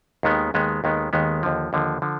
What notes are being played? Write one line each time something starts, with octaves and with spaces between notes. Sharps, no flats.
D#2 D#3 G#3 B3
D#2 D#3 G#3 B3
D#2 D#3 G#3 B3
D#2 D#3 G#3 B3
D#2 D3 F3
D#2 D3 F3
D3 F3